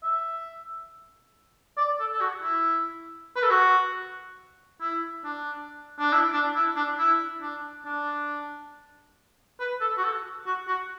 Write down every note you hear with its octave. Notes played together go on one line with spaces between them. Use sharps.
E5
D5
A4
A4
F#4
E4
B4
A4
F#4
E4
D4
D4
E4
D4
E4
D4
E4
D4
D4
B4
A4
F#4
A4
F#4
F#4